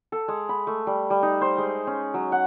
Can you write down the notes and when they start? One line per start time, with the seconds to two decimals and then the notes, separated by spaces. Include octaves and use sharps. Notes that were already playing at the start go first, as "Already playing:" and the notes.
0.12 A4
0.28 G#3
0.49 B5
0.67 A3
0.87 G3
1.10 G3
1.22 D#4
1.41 C5
1.58 G#3
1.87 C#4
2.14 F#3
2.32 F#5